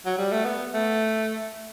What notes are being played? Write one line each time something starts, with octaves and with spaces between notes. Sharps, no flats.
F#3
G3
A3
B3
A3